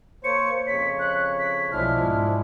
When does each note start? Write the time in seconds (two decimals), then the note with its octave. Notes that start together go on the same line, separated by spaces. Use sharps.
0.24 A#3 C5 C#5 C#7
0.67 F2 C#3 C#5 B6
0.99 F#6
1.39 B6
1.72 B1 F3 G#3 D4 E4 F6
2.02 G#2